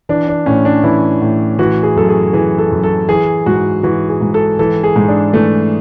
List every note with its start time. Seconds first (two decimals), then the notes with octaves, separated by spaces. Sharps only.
0.09 E3 D4
0.28 D4
0.46 A2 C#4
0.65 D4
0.84 E3 E4
1.21 A2
1.59 E3 F#4
1.83 G#4
1.96 F#2 A4
2.09 G#4
2.33 E3 G#4
2.59 A4
2.71 F#2
2.83 A4
3.09 E3 G#4
3.46 G#2 F#4
3.83 E3 F#4
4.09 G#4
4.21 G#2
4.34 A4
4.59 E3 A4
4.83 G#4
4.96 G#2
5.08 D4
5.34 E3 A3